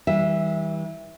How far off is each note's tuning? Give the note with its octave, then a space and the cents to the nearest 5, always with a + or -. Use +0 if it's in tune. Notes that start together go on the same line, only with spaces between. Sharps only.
E3 -35 G3 +0 E5 +0